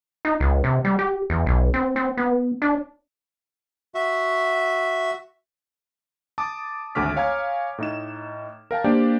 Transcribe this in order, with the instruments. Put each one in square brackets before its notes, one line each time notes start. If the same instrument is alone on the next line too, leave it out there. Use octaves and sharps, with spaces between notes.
[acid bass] D#4
C#2
C3
G3
G4
E2
B1
C4
C4
B3
D4
[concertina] F#4 E5
[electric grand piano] A5 D6 D#6
G#1 D2 A3 D6 F6 B6
C#5 F5 G#5 A#5 F6 G#6
A2 D#4 E7
A#4 F5 G5 A5
A#3 D4 G4 C5 D5 G5